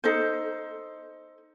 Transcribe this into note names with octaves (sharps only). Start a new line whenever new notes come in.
D#4 A4 C5